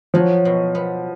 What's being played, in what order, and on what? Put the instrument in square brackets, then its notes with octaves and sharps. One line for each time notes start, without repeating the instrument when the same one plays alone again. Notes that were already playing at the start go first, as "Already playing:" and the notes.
[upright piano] F3 [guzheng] F#3
[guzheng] B2
B3